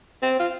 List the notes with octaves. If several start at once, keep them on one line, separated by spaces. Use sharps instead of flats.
C4
F4